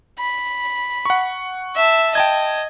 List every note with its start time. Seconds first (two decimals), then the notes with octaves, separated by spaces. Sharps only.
0.19 B5
1.05 F#5 C#6
1.76 E5 A5
2.15 D#5 G5 A5 G#6